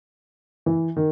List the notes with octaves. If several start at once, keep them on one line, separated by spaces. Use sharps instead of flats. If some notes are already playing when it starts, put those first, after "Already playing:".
E3
D#3